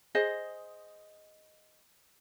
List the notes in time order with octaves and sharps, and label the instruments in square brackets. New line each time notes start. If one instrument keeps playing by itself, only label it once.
[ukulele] G#4 C5 D#5